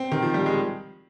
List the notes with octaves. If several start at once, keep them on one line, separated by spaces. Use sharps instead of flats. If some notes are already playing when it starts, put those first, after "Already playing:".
Already playing: C4
D#3
F3
G3
G#3